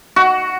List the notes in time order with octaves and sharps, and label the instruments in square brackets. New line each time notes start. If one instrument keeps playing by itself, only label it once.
[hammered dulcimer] F#4